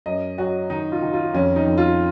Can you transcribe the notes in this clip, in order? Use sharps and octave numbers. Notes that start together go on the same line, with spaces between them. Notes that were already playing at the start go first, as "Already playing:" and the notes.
F#2 D#5
F#3 F#4
D#3 D#4
F4
D#3
F4
F2 C#4
D#4
F2
F4